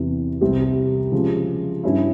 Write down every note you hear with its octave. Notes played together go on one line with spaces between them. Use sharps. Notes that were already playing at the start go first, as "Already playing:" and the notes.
Already playing: E2 C3 E3
C2 C3 G3 C4
C#3 F3 G#3
G2 G3 C#4 E4